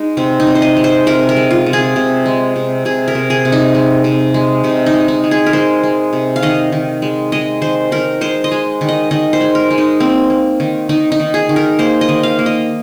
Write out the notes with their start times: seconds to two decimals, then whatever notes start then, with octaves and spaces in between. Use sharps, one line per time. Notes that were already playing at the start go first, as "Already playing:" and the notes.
Already playing: G#3 D#4
0.17 C3 C4
0.40 D#4
0.47 C3
0.55 C5
0.62 D#5
0.77 G#3
0.84 C5
1.06 C3 A#4
1.29 A#4
1.37 G#3
1.51 F4
1.66 C3
1.73 G#4
1.96 C3
2.26 G#3
2.56 C3
2.85 C3 G#4
3.08 A#4
3.15 C3
3.30 G#4
3.45 C3
3.52 D#4
3.75 G#3
4.04 C3
4.34 G#3
4.64 C3 D#4
4.86 D#4
4.94 G#3
5.08 D#4
5.24 G#3
5.31 G#4
5.46 A#4
5.53 G#3 C5
5.83 G#3
6.13 C3
6.36 F5
6.43 D#3 D#5
6.72 D#3
7.02 G#3
7.32 G#3 D#5
7.62 D#3 C5
7.92 D#3 A#4
8.21 G#3 C5
8.44 D#5
8.51 G#3
8.81 D#3
8.89 D#5
9.11 D#3 D#5
9.33 C5
9.41 G#3
9.55 A#4
9.71 G#3
9.78 D#4
10.00 A#3 C4
10.30 A#3
10.60 D#3
10.89 D#3 D#4
11.12 D#4
11.20 D#3
11.34 G#4
11.49 D#3
11.56 A#4
11.79 A#3 C5
12.01 D#5
12.09 D#3
12.23 F5
12.39 A#3
12.46 D#5